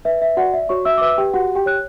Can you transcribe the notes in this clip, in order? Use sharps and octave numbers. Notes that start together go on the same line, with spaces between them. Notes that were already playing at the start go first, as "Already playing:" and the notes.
B4 E5
E5
F#4 D5 F#5
E5
F#4 C#5 C#6
E5 E6
D6
B4 E5 E6
G4 G5
F#4 G4 F#5
G4 G5
C#5 F#6